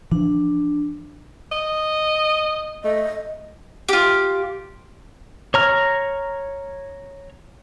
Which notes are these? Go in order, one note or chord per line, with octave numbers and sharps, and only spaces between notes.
E3 F3 D4
D#5
A3 D#5
F4 G4
C#5 A#5 F6